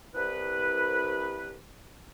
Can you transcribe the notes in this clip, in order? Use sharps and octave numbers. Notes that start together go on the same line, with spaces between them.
C2 B4